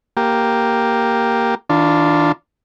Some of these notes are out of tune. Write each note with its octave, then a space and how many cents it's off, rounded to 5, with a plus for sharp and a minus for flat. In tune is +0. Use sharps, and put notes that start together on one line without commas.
A#3 +0 G4 +0
D#3 +40 D4 +0 F4 +0